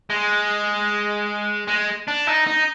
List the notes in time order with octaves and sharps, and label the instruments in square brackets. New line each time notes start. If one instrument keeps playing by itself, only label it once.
[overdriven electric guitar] G#3
G#3
D4
D#4
D#4